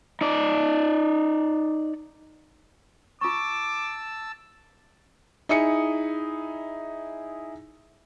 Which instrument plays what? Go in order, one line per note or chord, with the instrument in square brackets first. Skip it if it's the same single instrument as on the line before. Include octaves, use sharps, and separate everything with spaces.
[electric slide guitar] D#4 D5
[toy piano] F4 C#6 [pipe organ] A5 E6 [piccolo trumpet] D6
[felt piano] D#4 E4 G#4 D#6 C#7